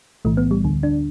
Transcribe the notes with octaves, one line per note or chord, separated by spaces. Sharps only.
B1 A2 E3 A3
B3
G3
D2 D3
D4